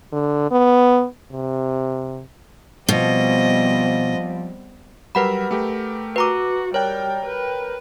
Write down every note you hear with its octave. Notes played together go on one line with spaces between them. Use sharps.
D3
B3
C3
B2 F3 G3 C4 D#5
F#3 G3 A#4 B4 F#5 B5
A3 G4 A#4
F#4 B4 A#5 D6
G3 A#4 C#5 G5
B4